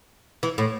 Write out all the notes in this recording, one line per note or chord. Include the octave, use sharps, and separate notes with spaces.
E3
A2